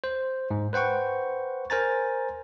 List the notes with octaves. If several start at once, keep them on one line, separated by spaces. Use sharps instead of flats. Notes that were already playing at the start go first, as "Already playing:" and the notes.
C5
G#2
B4 C5 F#5 G5 C#6
A#4 C5 G#5 A#5 A6